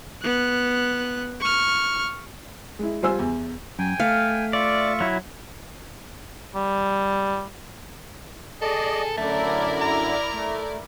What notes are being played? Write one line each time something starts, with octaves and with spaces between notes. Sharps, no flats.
B3 F#6
C#6 F6
G#3 E4
G3 F4 C5 G#5 E6
E2
F#2 G5 G#5
A3 F5
F4 D5 E5 C#6
F#3 E4
G3
G#4 A4 D5 D#5
F#2 D3 A3 E4 A#4 D5
A#5
A3